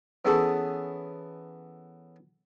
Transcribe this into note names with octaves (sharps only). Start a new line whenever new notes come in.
E3 B3 C#4 G#4 A4